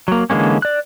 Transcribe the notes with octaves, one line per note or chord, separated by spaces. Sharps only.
F#3 A#3
D3 E3 G#3 A#3 C#4
D5 F#6